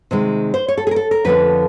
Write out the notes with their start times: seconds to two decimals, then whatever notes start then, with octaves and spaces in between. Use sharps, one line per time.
0.11 C3 D#3 G#3
0.54 C5
0.68 C#5
0.77 A4
0.87 G#4
0.91 A#4
0.96 A4
1.11 A#4
1.25 F2 D3 F3 A3 C#4 B4